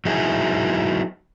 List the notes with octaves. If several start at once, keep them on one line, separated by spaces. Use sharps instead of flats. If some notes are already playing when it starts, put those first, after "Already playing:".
F#3 D#4 E4 G#4